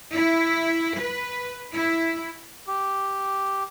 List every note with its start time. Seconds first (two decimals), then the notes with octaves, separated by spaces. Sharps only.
0.14 E4
1.00 B4
1.73 E4
2.68 G4